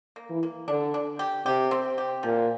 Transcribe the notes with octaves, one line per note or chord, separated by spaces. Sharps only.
A#3
E3
A#3
D3 D4
D4
G4
C3 G4
C4
G4
A#2 F3